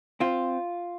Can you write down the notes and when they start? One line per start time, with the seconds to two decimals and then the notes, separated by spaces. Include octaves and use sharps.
0.20 C4 F4